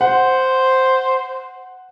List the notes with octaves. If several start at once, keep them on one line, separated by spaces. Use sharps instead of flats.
C5 F#5